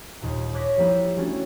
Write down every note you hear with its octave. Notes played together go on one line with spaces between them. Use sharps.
D#2 A#2
C#5 D6 F#6 G#6 A#6 B6
F3 G3 A#3 E4 B4
G3 A3 C#4 D4 F#4